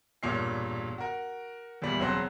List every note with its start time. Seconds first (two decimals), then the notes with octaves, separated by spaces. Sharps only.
0.23 E1 G2 A#2 C#5 F6 C7
0.98 F#4 A#4
1.82 E2 A#2 G3
1.99 E1 C#2 F#3 C4 C5 F#6